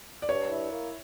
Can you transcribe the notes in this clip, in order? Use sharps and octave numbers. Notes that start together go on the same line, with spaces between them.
D5
G2 C#5
E4
A#3